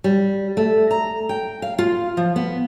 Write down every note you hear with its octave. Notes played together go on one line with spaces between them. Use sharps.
G3
A3
A#5
G5
F5
F4
F3
B3